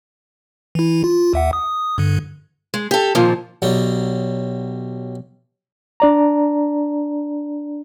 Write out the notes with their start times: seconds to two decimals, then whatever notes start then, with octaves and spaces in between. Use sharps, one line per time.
0.75 E3 E4
1.04 F4
1.33 D#2 E5 F#5
1.53 D#6
1.98 G2 D3
2.74 G#3
2.91 G4 A4
3.15 F2 A#2 D#3 F3
3.62 B1 F#3 G3
6.00 D4 D5 A#5